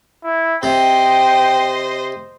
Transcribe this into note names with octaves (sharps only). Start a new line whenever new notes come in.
E4
C3 C5 D#5 G5